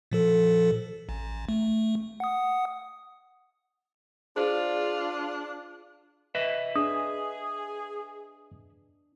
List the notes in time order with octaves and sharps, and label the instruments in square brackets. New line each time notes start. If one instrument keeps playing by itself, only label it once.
[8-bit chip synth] A#2 F3 A4
A1
A3
F#5 D#6
[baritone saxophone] D4 [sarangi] F4 [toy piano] G#4 C5 [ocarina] D5
[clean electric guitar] B4 D#5 E5
[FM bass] D4 [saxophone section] G#4 [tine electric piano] D#6